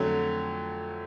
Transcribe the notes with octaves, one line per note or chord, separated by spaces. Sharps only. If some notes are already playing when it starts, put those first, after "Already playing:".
Already playing: F2 D3 F#3 A3 C#5